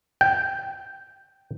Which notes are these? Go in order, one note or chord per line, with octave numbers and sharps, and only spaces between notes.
G5